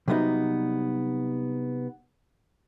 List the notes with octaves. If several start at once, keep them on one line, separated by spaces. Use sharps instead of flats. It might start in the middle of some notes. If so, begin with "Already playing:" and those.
C3 F#3 G3 B3 D4 D#4